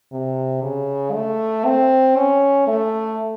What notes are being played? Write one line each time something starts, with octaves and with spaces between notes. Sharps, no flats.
C3
C#3
A3
C4
C#4
A3